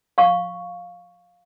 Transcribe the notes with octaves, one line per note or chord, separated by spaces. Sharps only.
F5 C#6